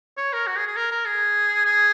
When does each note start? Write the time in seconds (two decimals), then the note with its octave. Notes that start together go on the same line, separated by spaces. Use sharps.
0.17 C#5
0.33 A#4
0.47 F#4
0.57 G#4
0.67 G#4
0.76 A#4
0.91 A#4
1.06 G#4
1.65 G#4